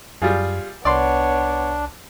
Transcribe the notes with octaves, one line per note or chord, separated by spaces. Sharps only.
F#2 G3 F4 G#4
C2 B3 D4 C#5 D5 C6